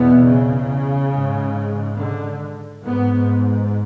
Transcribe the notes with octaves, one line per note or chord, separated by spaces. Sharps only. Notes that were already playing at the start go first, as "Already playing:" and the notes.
Already playing: E2 B2 B3
C#3
G#2
D3
G#2 B3